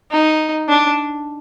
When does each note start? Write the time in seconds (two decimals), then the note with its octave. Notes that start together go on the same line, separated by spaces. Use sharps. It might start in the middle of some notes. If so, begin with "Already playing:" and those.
0.11 D#4
0.69 D4